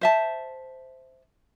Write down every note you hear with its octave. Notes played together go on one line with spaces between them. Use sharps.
C5 E5 A5